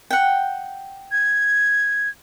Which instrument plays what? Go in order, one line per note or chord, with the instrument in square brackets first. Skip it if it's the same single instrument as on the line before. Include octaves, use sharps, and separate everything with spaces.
[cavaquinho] F#5 G5
[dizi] G#6